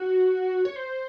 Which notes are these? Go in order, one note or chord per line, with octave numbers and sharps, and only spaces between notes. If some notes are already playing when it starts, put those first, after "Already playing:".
Already playing: F#4
C#5
C5